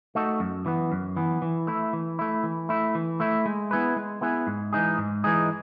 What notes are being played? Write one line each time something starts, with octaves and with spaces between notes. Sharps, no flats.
A3 D#4 F#4 A4
F#2
E3 B3
F#2
E3 B3
E3
A3 E4
E3
A3 E4
E3
A3 E4
E3
A3 E4
G#3
B3 E4 G#4 B4
G#3
B3 E4 G#4 B4
G#2
E3 G#3 D#4 G#4
G#2
E3 G#3 D#4 G#4